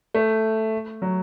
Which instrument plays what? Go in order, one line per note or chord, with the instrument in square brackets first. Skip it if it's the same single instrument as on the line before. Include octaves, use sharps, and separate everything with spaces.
[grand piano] A3
F#3